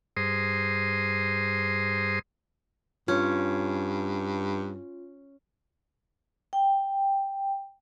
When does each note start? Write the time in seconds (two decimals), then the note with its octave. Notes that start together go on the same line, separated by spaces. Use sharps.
0.17 G2 G#4 C5 A#5 C6 D#6
3.08 G2 C#4 F4
6.53 G5